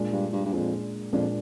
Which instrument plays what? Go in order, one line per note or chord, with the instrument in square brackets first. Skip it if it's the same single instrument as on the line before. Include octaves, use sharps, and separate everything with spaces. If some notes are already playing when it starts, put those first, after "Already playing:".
Already playing: [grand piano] A#2 G#3 D4
[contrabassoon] G2
G2
G2
[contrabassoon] F2 [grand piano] A#2 G#3 D4
[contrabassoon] F2 [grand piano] A#2 G#3 D4